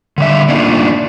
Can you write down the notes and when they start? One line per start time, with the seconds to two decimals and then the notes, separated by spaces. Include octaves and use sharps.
0.18 D3 G3 E5
0.48 A3 A#3 D4 D#4 F4